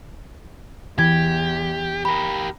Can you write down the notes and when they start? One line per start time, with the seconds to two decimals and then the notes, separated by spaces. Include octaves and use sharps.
0.99 E2 E3 G4 G#6
2.05 G4 A#4 B5